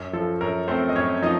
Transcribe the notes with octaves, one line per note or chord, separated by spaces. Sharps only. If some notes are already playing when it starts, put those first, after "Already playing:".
Already playing: F#2
F3 A4
F#2 A#4
A3 C4 C5
D#5
F#2 C#4 C#5
F3 D#4 D#5